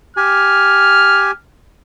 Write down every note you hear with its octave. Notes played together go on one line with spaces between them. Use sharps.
G4 G#5 F6